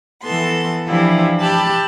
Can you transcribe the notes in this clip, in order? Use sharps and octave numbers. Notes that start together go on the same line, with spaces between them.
E3 B3 A4 C6
E3 F3 D4 E4 F4 G4
G4 A5 B5 E6 F#6